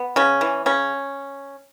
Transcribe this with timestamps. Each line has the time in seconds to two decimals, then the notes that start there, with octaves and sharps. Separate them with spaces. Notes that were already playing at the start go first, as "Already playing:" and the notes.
Already playing: B3
0.16 C#3 C#4
0.41 E3
0.66 C#3 C#4